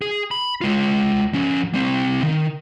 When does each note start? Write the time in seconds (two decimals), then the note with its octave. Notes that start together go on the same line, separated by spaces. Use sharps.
0.02 G#4
0.31 B5
0.61 G#3 F4
1.34 F3 C#4
1.74 G3 C4
2.23 D#3